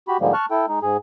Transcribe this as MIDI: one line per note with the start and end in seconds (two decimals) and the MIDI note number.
0.08 0.17 66
0.08 0.17 67
0.08 0.17 83
0.21 0.33 44
0.21 0.33 50
0.21 0.33 53
0.21 0.33 55
0.21 0.33 56
0.21 0.33 58
0.34 0.46 81
0.34 0.46 85
0.34 0.46 89
0.34 0.46 90
0.51 0.66 64
0.51 0.66 69
0.51 0.66 79
0.69 0.79 56
0.69 0.79 63
0.82 0.97 44
0.82 0.97 68